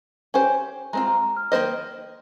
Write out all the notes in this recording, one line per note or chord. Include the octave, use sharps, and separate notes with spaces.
C#4 G4 C5 G#5
G#3 C4 F4 A#5
A#5
A#5
F6
D#3 A#3 F4 C5 D#5